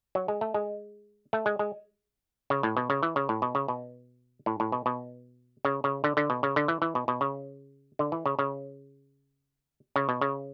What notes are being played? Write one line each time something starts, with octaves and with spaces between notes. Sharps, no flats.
F#3
G#3
A3
G#3
A3
G#3
G#3
C#3
A2
B2
C#3
E3
C#3
A2
B2
C#3
B2
A2
A2
B2
B2
C#3
C#3
D3
D3
B2
C#3
D3
E3
E3
B2
B2
C#3
D3
E3
C#3
C#3
C#3
B2
C#3